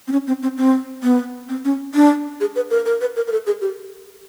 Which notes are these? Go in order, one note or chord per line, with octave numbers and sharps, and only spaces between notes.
C4
C#4
C4
C4
C4
B3
C4
C#4
D4
G#4
B4
A#4
A#4
B4
A#4
A#4
A4
G#4
G4